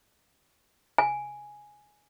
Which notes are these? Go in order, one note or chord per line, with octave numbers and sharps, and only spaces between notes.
G#5